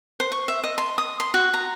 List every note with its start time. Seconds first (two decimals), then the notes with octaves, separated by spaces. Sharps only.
0.20 C5
0.32 C#6
0.48 E5
0.64 D#5
0.78 C6
0.98 D#6
1.20 C6
1.34 F#4
1.54 A#5